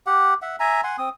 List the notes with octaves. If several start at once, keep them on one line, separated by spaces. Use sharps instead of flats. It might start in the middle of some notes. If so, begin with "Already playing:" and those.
G4 F#5
E5 F#5
E5 G#5 A#5
F#5 G#5 C6
C4 D#6